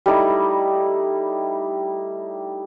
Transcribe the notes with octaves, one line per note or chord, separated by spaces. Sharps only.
G3 A3 D#4 E4